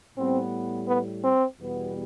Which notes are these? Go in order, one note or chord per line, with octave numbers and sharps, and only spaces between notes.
A2 G3 B3 C4
B3
C4
E2 B2 G3 B3